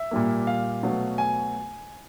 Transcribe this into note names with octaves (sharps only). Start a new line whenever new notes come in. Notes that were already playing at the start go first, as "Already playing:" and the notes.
Already playing: E5
A#2 G3 A#3
F5
B2 F#3 A3
G#5